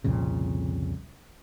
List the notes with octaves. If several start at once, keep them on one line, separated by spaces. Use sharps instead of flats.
C2 F2 A#2 C#3